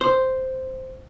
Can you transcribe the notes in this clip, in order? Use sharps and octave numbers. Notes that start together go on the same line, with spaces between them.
C5